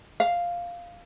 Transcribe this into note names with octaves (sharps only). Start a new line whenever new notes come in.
F5